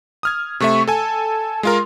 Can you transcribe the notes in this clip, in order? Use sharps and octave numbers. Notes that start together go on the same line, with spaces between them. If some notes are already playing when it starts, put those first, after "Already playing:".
D#6 F6 G#6
C3 A3 E5 C#6
A4 G#5 A5
G#3 F4 A#4 C6